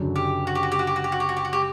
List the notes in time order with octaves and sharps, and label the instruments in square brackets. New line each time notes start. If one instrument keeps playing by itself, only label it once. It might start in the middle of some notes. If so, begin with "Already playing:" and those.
Already playing: [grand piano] F#1 F#2 D3 F#3
[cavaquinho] G4
F#4
G4
F#4
G4
F#4
G4
F#4
G4
F#4
G4
F#4
G4
F#4
G4